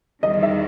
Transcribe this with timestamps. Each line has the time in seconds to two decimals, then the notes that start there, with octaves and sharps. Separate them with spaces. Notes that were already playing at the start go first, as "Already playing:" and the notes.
0.23 E2 D#3 G3 D#5
0.43 E5